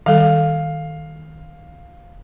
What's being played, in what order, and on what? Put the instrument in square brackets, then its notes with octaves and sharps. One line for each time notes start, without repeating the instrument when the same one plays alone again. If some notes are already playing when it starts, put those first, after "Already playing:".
[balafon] D#3 G3 A4 [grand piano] F5